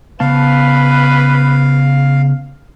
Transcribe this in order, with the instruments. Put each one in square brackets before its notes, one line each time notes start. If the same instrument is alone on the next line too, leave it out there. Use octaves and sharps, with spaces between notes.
[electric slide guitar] C#3 B3 A5 [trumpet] B4 [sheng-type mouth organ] F5